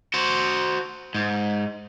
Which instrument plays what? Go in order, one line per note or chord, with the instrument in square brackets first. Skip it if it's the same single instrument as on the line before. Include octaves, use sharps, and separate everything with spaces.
[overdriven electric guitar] F#4 C5
G#2